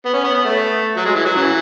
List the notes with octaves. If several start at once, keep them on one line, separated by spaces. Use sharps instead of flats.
B3
C#4
B3
B3
A3
F#3
G#3
E3
F#3
C#3 E3